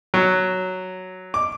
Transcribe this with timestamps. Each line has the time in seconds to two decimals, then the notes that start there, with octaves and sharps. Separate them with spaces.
0.14 F#3
1.34 D6